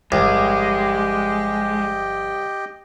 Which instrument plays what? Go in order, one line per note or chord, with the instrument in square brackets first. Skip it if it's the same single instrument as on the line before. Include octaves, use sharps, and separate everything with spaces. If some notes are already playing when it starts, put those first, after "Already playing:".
[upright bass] G1 F2 [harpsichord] C2 [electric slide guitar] G#3 [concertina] G4 D#5 G5